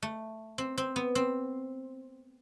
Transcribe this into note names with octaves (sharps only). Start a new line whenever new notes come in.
A3
C4
C4
B3
C4